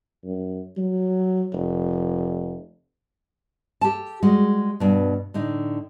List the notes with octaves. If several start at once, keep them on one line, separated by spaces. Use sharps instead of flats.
F#2
F#3
F1
G4 A4 A5
G3 G#3 F#4
G2 B2
A2 D3 D#4